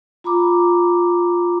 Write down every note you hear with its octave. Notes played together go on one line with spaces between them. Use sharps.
F4 A#5 B5 D6